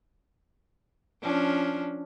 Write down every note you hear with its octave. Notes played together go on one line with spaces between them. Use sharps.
F3 C#4 D4